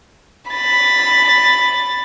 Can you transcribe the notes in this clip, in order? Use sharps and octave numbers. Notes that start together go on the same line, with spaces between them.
B5 A6